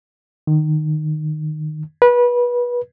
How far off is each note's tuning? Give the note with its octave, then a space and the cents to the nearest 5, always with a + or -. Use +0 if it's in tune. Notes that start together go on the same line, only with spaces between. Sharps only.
D#3 -20
B4 -25